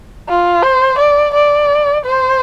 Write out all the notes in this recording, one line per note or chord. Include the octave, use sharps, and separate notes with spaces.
F4
C5
D5
D5
C5